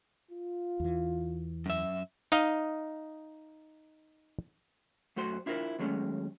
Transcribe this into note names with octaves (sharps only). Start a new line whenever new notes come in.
F4
E2 E3
F#2 E5
D#4 D#5 F5
F#2 A3 F#4 C5 C6
D4 E4 F4 G#4 A#4 C5
D#2 F#3 G#3 A3 C#4